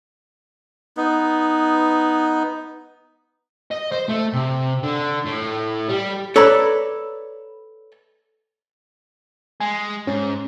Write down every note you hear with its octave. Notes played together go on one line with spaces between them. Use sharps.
B3 D#4
D#5
C5
A3
C3
D3
A2
G3
A4 B4 C#5 D5 A#5 B5
G#3 G#5
G#2 C#4